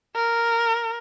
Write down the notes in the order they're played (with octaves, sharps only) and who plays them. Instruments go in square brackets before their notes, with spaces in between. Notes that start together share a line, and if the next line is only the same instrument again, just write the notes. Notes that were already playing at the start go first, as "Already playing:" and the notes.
[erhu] A#4